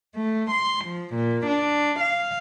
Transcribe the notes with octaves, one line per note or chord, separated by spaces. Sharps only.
A3
C6
F3
A#2
D4
F5